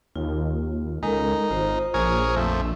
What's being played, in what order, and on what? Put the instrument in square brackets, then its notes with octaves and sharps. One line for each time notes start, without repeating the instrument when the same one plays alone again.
[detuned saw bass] D#2 [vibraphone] F4
[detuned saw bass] C#2 [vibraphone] G#3 A4 A#4 [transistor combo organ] D#4
[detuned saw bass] G#1 [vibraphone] F4 C5
[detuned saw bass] A#1 [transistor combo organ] G#4 A#4 C#5
[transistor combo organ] F2 A3